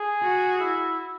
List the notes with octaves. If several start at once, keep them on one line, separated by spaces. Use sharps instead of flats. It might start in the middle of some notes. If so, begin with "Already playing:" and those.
Already playing: G#4
F#4
E4